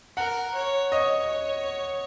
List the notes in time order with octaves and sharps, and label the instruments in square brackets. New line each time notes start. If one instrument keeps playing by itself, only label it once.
[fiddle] A#4 [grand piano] F#5
[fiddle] C#5
[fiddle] C#5 [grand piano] D#5